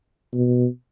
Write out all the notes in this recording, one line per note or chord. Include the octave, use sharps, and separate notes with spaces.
B2